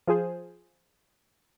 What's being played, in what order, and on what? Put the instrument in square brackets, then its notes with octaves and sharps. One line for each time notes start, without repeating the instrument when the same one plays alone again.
[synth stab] F3 F4 G#4 C5